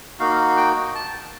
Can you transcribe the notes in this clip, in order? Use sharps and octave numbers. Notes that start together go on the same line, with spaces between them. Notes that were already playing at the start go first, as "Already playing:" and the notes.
A#3 D#4 F#4 F5
G5
A5